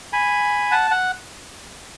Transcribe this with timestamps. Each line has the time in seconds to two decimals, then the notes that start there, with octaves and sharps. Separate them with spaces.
0.13 G#5 B5
0.71 F#5 A5
0.91 F#5